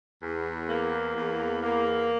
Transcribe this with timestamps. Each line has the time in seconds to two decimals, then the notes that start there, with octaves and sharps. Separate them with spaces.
0.23 E2
0.70 A#3
1.16 E2
1.62 A#3